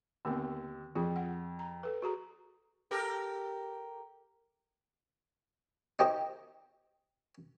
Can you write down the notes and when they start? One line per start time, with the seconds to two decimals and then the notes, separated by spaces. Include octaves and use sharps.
0.25 D#2 D3 B3 C4 E6
0.95 F2 F4 G#4
1.16 F#5
1.59 A#5
1.83 A4 B4
2.02 F#4 G#4 A#5
2.91 G4 A4 A#4
5.99 D#4 G4 C5 D#5